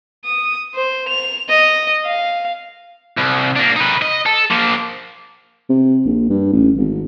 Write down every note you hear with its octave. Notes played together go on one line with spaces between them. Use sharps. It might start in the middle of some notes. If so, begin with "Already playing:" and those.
D#6
C5
F7
D#5
F5
C2
A#3 D4
D#4 B4
D#5
A4
F3 A#3
C3
A#1
G2
A1
G#1